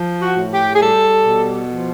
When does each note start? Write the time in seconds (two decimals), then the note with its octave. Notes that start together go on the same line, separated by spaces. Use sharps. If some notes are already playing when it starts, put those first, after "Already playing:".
Already playing: F3
0.20 F#4
0.36 A2
0.51 G4
0.72 G#4
0.80 G3 A4
1.24 B2
1.68 F3